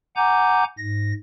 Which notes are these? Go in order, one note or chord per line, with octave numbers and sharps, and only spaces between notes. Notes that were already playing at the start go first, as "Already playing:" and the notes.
F#5 G#5 A#5 D6 G6
G#2 A#6